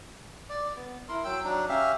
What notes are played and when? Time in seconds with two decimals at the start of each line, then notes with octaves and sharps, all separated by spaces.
0.49 D5
0.76 B3
1.08 E4 A#4 C6
1.24 F#3 G5 E6
1.44 F#3 D4 D#4
1.69 C#4 G4 E5 F5